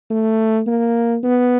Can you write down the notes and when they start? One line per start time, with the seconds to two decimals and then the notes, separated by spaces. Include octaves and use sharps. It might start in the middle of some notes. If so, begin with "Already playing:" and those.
0.10 A3
0.67 A#3
1.23 B3